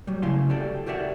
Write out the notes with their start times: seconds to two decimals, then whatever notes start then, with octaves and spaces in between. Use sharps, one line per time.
0.07 F#3 G3
0.22 C#3 A3 E4 F5 C6
0.49 F#4 G4 A4 D5 G5
0.86 F#4 G4 A#4 D5 E5 F#5